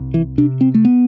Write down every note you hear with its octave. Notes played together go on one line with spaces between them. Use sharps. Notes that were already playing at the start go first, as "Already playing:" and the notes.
Already playing: C2
E3
C3 D4
C4
A3
B3